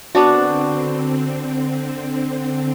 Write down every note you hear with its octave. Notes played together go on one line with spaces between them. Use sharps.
D3 B3 C4 D4 F#4